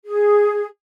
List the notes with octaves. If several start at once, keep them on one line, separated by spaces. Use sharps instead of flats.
G#4